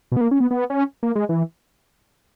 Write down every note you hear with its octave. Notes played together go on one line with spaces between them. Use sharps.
B2
B3
A#3
C#4
B3
B3
C#4
A#3
G#3
E3